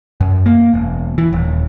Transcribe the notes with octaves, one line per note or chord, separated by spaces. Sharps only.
F#2
A#3
E1
E3
D#1